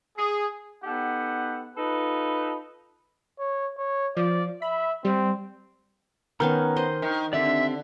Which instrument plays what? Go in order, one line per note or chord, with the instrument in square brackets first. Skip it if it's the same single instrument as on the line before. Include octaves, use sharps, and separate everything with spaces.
[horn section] G#4
B3 D#4 G4 A4 F#5
D#4 F4 A4 B4
[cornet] C#5
C#5
[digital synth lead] F3 [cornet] D5
[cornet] E5 [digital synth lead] B5
[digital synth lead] G3 [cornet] C4
[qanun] D#3 B3 C#4 [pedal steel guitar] A#5 F6 G6
[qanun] C5 D#5
[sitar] D#3
[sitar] D3 [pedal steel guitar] C4 G4 D5 [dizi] E5